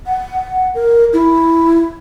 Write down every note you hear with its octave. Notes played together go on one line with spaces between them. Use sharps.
F#5
A#4
E4